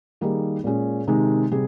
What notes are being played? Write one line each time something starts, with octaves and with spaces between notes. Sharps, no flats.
D#3 G3 A#3 D#4 G#4
A#2 G#3 C#4 G#4
C3 D#3 G#3 D#4
C3 G3 G#4